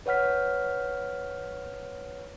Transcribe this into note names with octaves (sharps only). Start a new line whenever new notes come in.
B4 C#5 F#5 F6 B6